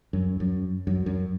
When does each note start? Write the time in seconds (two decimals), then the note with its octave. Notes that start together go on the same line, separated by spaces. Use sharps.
0.13 F#2
0.40 F#2
0.87 F#2
1.06 F#2